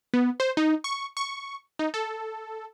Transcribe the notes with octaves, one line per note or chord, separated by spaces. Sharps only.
B3
C5
D#4
C#6
C#6
D#4
A4